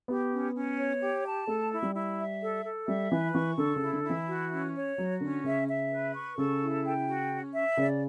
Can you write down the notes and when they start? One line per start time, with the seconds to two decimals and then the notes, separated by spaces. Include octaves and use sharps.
0.08 B3 G4
0.31 C#4
0.54 C#4
0.78 C#5
1.01 G4
1.24 A5
1.47 A3 A4
1.71 E4
1.82 G3
1.94 E4
2.18 E5
2.41 A4
2.64 A4
2.87 G3 E5
3.11 E3 B4
3.34 E3 C#6
3.58 D3 A4
3.76 C#3
3.81 E4
3.93 D3
4.04 E4
4.10 E3
4.28 F#4
4.52 C#4
4.74 C#5
4.98 F#3 F#4
5.21 D3 C#4
5.44 C#3 E5
5.67 E5
5.91 B4
6.14 C#6
6.38 C#3 A4
6.61 E4
6.85 G5
7.08 F#4
7.31 C#4
7.54 E5
7.77 C#3 D5